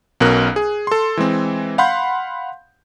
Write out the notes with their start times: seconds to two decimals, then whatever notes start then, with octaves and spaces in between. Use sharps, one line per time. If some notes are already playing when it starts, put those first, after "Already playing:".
0.21 B1 B2 C#4 A#4 F#6
0.56 G#4
0.87 A4 C6
1.17 E3 G#3 C4
1.78 F5 F#5 B5 C6 G6